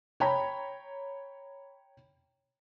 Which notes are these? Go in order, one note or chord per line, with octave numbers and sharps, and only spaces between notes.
C#5 G5 A#5 B5